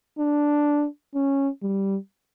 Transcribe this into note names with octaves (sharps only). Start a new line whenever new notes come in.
D4
C#4
G3